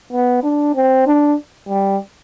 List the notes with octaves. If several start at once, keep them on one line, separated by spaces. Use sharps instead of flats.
B3
D4
C4
D4
G3